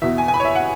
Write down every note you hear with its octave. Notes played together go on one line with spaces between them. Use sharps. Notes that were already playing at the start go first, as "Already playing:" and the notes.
E2 B2 E5
G#5
G#5
B5
C#5
E5
F#5